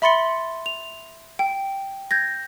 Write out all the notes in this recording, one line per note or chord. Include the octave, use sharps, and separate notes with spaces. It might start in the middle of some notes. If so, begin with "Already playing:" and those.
E5 B5 C6 A6 C#7 G7
F7
G5
G6 G#6 A#6